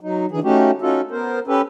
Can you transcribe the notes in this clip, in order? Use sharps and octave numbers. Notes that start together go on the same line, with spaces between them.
F#3 D#4
D3 E3 G#4
A3 C#4 D#4 F#4 G4
C#4 D#4 F4 F#4 A4
B3 A#4 C5
C#4 G4 A4 B4